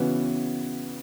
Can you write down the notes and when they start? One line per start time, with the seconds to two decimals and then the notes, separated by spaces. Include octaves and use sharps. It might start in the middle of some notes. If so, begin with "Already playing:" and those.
Already playing: C#3 E3 B3 F#4